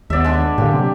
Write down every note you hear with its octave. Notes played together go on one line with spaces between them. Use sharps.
D#2 B3 D5 E5
D3 G#3
A2 D3 A#3 G4
C3 F#3 C4